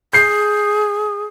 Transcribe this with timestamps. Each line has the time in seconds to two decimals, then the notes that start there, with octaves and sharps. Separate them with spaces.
0.13 G#4 G6 C7